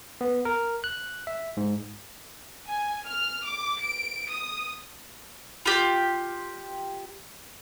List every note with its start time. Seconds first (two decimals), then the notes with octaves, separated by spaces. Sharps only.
0.21 B3
0.45 A#4
0.84 F#6
1.27 E5
1.57 G#2
2.68 G#5
3.06 F6
3.44 D6
3.80 D7
4.30 D#6
5.66 F4 G4